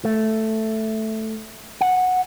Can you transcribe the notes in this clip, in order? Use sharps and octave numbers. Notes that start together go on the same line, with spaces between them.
A3
F#5